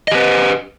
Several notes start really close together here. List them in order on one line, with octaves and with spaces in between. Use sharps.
D#5 G4 B4